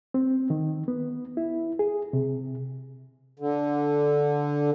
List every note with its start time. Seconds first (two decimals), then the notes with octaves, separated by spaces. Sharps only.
0.14 C4
0.50 D#3
0.88 B3
1.37 E4
1.79 G#4
2.13 C3
3.40 D3